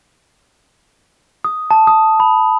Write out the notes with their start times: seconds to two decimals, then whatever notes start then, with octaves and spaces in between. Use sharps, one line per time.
1.44 D#6
1.71 A5
1.87 D#6
2.20 B5